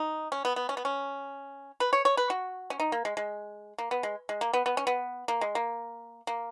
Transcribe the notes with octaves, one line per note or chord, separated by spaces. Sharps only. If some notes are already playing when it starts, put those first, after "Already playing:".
Already playing: D#4
C#4
B3
B3
C#4
B3
C#4
B4
C#5
C#5
B4
F#4
C#4
D#4
A#3
G#3
G#3
A#3
B3
G#3
G#3
A#3
B3
B3
C#4
B3
A#3
G#3
A#3
A#3